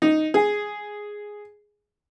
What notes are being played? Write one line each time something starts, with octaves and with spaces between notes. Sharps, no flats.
D#4
G#4